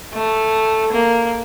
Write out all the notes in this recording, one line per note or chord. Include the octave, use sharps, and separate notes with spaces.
A3
A#3